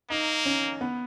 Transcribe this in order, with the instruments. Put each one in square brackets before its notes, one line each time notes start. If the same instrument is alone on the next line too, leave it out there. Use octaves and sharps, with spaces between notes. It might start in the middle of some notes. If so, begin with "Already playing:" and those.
[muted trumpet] A#3 [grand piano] D#4
[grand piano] C#4
B3